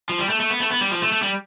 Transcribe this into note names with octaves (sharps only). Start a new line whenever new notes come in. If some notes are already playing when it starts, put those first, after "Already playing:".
F3
G3
A3
A3
B3
A3
B3
G3
F3
A3
A3
G3